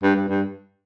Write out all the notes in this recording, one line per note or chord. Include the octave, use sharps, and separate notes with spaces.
G2
G2
G2